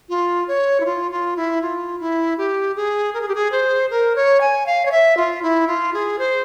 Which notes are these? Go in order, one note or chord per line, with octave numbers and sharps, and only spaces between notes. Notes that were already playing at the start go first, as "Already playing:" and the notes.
F4
C#5
E4
F4
F4
E4
F4
E4
G4
G#4
A#4
G#4
G4
G#4
C5
A#4
C#5
G#5
F5
C#5
E5
F4
E4
F4
G#4
C5